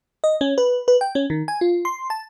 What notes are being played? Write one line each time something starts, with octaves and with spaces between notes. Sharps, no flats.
D#5
C#4
B4
B4
G5
C#4
D#3
G#5
F4
C6
A5